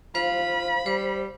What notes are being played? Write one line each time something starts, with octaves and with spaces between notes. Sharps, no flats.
F4 C5 F5 B5
G3 C5